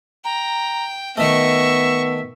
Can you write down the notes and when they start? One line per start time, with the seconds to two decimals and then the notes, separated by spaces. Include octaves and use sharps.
0.24 G5 A#5
1.17 D#3 A3 B3 D#5 E5 C#6